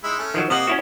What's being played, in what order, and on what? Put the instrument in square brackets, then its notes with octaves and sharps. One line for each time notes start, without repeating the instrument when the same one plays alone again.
[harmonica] G#3 D#4 E4
A3 C#4
[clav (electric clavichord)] D#3 F3 F#3
[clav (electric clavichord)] C3 F#5 [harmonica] A#3 D#5 F5
[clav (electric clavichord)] C#4 E4 F#4